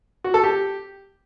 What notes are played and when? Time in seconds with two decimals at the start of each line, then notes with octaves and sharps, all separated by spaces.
0.24 F#4
0.34 A4
0.44 G4